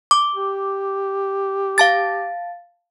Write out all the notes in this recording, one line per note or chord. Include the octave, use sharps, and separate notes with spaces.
D6
G4
F5 A5 A6